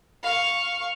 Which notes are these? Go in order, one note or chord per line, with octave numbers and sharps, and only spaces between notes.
F5 C#6